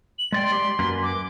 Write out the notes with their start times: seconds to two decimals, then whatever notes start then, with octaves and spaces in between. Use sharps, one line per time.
0.19 F#7
0.32 G#3 D5 G5 C6
0.52 G4 D5
0.79 F#2 A#3 B4
1.03 D6